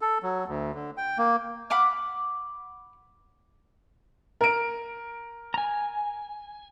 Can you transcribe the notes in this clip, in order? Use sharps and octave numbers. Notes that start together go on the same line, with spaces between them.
A4
F#3
D2
D3
G5
A#3
F#5 B5 D6 F6
A#4 D7
G#5 A#5